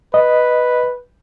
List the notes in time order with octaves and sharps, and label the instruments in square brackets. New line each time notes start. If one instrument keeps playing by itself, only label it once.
[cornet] B4 [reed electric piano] D#5